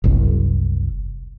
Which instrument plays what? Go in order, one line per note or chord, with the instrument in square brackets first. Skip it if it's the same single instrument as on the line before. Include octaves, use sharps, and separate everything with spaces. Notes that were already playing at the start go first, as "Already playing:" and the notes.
[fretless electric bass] F#1 C2